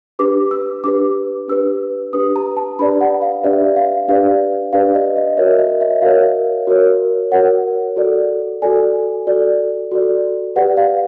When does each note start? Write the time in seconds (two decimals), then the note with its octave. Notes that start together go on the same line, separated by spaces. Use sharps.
0.19 D4 G4 B4 D6
0.51 E6
0.84 D4 G4 B4 D6
1.48 D4 G4 B4 E6
2.13 D4 G4 B4 D#6
2.36 A#5
2.57 A5
2.79 D4 G4 B4 D5 B5
3.01 F#5
3.22 F5
3.43 D4 G4 B4 D5 E5
3.76 F5
4.08 D4 G4 B4 D5 F5
4.73 D4 G4 B4 D5 F5
4.95 D#5
5.17 D#5
5.37 F#4 A#4 C#5 E5
5.59 D#5
5.81 E5
6.02 F#4 A#4 C#5 F5
6.67 F#4 A#4 C#5
7.31 F#4 A#4 C#5 F#5
7.96 F#4 A4 D5
8.62 F#4 A4 D5 G#5
9.27 F#4 A4 D5
9.91 F#4 A4 D5
10.56 G4 B4 D5 F#5
10.77 F5